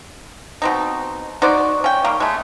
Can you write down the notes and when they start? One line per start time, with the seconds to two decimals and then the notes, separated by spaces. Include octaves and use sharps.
0.62 B2 C4 D#4
1.42 D#4 F#4 C5 D5
1.84 C#4 G5
2.05 D#3 G3 A#3
2.20 G#3 A3